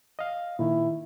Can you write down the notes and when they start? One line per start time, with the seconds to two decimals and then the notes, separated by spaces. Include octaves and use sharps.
0.19 D#5 F5
0.59 A#2 D#3 E4